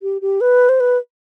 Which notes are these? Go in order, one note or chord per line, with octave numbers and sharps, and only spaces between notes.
G4
G4
B4
C5
B4